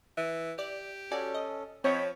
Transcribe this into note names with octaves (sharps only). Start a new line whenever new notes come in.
E3
G4 D5
C#4 F#4 A4 D5 G#5
D#5
F3 C4 C#5 D#5 G5 B5